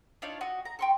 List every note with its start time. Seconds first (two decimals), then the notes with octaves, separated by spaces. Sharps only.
0.22 D4 D#4 F4 C#5
0.41 F#4 D#5
0.65 A#5
0.79 G5 C6 C#6